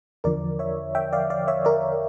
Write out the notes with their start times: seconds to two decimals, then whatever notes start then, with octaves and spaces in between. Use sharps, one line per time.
0.24 E2 D3 F3 A#4 D5
0.59 C#5 E5
0.95 E5 G5
1.13 D5 F5
1.30 D5 F5
1.48 C#5 E5
1.65 A#4 D5